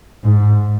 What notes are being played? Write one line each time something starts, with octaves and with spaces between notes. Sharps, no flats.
G#2